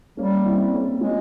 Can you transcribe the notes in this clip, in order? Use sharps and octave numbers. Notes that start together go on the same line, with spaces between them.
G3 A#3 C#4
C4 E4
A#3 C#4
G#3 C#4 F4